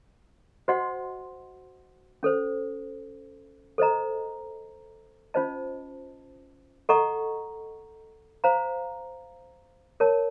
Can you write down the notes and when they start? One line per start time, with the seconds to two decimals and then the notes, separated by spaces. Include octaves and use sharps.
0.68 F#4 C5 D#5 F#5 C6
2.23 C#4 A4 C5
3.78 A4 C5 D#5 A#5
5.34 C#4 F4 C5 D#5 A5
6.89 A4 D#5 F#5 A#5 C#6
8.44 C5 F5 A#5
10.00 A#4 C#5 A5